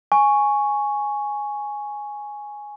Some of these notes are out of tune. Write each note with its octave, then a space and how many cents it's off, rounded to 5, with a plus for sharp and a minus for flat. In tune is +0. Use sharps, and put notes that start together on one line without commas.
G#5 +0 C#6 +0